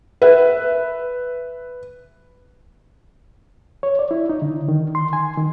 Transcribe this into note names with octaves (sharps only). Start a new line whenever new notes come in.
B4 E5
C#5
D5
E4
D#4
D3
D#3
C6
G#5
D#3